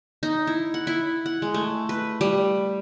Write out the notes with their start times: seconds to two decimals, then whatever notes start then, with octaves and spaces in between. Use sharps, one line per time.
0.23 D#4
0.47 E4
0.74 F#5
0.87 E4
1.26 F#5
1.42 G#3
1.54 A3
1.89 B4
2.21 G3